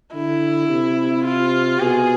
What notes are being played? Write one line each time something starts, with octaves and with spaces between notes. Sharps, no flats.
D3 E4
C3
F4
B2 G#4